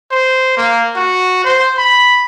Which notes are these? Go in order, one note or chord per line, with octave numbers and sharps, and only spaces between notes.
C5
A#3
F#4
C5
B5